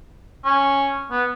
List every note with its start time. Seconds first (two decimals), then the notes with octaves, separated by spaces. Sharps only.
0.45 C#4
1.11 B3